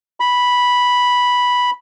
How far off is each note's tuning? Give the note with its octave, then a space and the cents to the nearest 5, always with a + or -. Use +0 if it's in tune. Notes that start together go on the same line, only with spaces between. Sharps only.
B5 -5